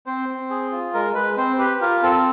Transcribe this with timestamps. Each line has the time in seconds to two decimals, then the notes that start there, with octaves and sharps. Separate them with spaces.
0.06 C4 C5
0.29 C4
0.50 G#4
0.72 F4
0.94 G#3 A#4
1.15 G#3 B4
1.37 C4 C5
1.58 G4 B4
1.81 F4 A#4
2.02 C4 A4